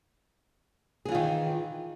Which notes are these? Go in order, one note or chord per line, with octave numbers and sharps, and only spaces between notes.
D#3 E3 F4 G#4